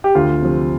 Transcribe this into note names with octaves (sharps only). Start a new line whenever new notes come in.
G4
D2 F4
C3 F3